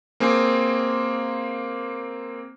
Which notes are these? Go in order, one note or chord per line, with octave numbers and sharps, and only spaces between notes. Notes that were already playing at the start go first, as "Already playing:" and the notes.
A#3 C4 G#4